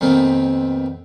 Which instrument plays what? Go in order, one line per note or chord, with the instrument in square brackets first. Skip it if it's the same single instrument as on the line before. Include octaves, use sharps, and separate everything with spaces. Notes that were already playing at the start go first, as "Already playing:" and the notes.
[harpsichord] F2 A#2 D#3 B3 C4